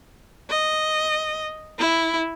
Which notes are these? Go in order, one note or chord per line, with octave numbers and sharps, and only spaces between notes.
D#5
E4